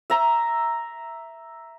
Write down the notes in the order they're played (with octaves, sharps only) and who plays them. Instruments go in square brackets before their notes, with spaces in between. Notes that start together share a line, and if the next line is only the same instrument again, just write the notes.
[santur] E5 A#5